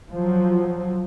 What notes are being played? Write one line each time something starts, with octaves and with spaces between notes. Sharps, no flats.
F3 F#3